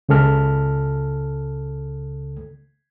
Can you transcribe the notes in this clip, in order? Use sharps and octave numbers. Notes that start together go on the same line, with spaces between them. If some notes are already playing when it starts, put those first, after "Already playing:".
C#2 C#3 A4 F6